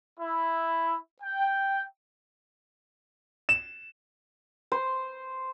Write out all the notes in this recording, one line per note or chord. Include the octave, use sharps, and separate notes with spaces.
E4
G5
E7
C5